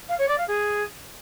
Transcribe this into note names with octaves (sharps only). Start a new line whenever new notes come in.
F5
C#5
D5
F5
G#4